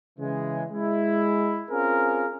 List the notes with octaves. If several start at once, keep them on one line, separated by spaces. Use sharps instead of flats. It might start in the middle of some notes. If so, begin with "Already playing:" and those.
C#3 E3 G#3
G#3 E4
C4 C#4 F4 G#4 A#4